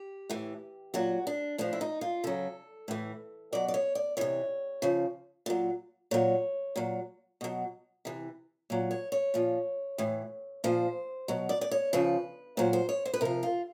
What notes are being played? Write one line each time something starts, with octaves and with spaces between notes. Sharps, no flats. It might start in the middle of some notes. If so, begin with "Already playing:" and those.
Already playing: G4
A2 E3
A#2 F#3 F#4
D4
A2 F3 D4
E4
D#4
F4
C#3 F#3 A4
A2 E3
B2 F#3 D5
D5
C#5
D5
C3 E3 C#5
C#3 F3
A#2 F#3
A#2 F#3 C#5
A#2 F#3
B2 F#3
C3 E3
A#2 F#3
C#5
C#5
A#2 F3
A2 E3
A#2 F3 C5
B2 F#3
D5
D5
C#5
C#3 F3 B4
A#2 F#3 C5
C5
C#5
C5
B4
C3 F3 A#4
F4